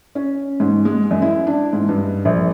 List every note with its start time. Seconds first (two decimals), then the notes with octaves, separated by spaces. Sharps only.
0.15 C#4
0.60 G#2
0.85 G#3
1.11 F#2
1.22 E4
1.47 D4
1.73 G#2
1.89 G2
2.25 A#1